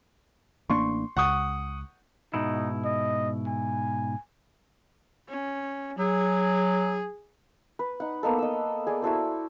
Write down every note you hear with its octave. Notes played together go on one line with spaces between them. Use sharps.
A1 A#3 D4 C6 C#6
C#2 F#5 C#6 D#6
G#2 B2 D#4 E4
D#5
G#5
C#4
F#3 G#4
B4
D#4 F#5
A#3 B3 D#4 A4
D#5 E6
G#4 D5
E4 F#4 A4 C5